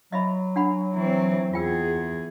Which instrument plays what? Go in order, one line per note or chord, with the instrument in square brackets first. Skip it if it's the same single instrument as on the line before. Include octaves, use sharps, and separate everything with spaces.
[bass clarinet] F#3 [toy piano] D#5 E5 B5
[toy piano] D4 F#5 B5
[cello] E3 C4
[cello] E2 G#4 [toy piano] F4 G5 E6